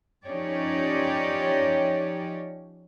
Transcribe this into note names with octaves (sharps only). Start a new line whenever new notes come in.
F3 C#4 D#4 G4 C#5 D5